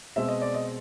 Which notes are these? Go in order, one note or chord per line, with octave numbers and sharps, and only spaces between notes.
B2 G#3 C4 E5
D#5
D5
D#5